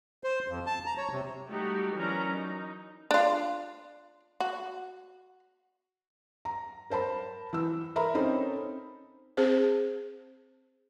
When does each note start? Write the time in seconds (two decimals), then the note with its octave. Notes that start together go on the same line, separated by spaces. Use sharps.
0.24 C5
0.48 F2
0.66 A5
0.86 A#5
0.98 C#5
1.11 C3
1.49 G3 A3 D#4 F#4 G4
1.95 E3 F#3 C#4 D4 A#4 A#5
2.30 D#4
3.11 D4 F4
4.40 F#4
6.45 A#5
6.90 A#4 C5 A5 B5
7.53 E3 E6
7.96 A#4 E5 A#5 B5
8.14 C4 C#4 D#4 A4 C5 B5
9.37 C4 G#4 C5